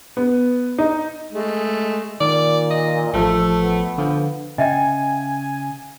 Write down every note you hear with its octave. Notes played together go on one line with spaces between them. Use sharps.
B3
D#4
G#3 A3
A#2 D#3 D5
D#5
A1 F3 A3 A4
B3
D3 F3
C#3 D#5 E5 G5 G#5